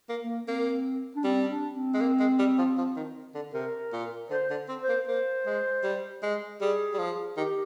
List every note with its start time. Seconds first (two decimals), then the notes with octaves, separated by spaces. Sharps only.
0.09 A#3
0.22 A#3
0.47 A#3 C4
1.16 D4
1.24 G3 C4
1.50 D4
1.75 C4
1.94 G#3
2.01 A#3
2.20 G#3
2.39 G3
2.58 F3
2.78 F3
2.96 D#3
3.35 D3
3.54 C3 A#4
3.93 A#2
4.30 D3 C5
4.50 D3
4.69 C4
4.82 C5
4.88 A#3
5.08 A#3 C5
5.46 G#3
5.84 G3
6.23 G#3
6.60 G3 G#4
6.94 G3
6.99 F3
7.37 D#3 G4